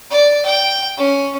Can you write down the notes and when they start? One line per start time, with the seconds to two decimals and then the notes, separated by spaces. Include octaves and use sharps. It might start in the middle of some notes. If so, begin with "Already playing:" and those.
0.11 D5
0.46 G5
0.97 C#4